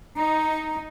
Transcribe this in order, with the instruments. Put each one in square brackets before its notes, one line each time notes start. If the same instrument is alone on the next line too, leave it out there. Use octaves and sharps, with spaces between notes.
[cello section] D#4 [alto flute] A#5